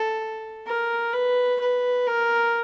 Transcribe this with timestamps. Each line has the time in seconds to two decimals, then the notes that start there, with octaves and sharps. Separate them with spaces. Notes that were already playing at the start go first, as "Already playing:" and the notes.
Already playing: A4
0.67 A#4
1.13 B4
1.60 B4
2.07 A#4